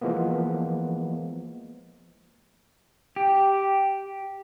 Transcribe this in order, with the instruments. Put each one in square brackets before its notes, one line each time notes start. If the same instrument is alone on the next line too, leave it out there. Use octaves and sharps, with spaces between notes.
[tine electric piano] E3 F3 G#3 A#3 B3
[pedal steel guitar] G4